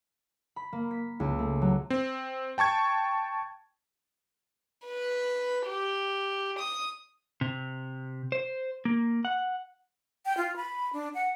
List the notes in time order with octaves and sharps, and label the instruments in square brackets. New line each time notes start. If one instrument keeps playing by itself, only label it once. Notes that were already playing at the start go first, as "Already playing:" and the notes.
[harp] B5
A#3
B6
C#2
A3
F#3
[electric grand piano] C4
G5 A5 C#6 G#6
[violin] B4
G4
D#6
[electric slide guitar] C3
C5
A#3
F#5
[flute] G5
F4
B5
D4
F#5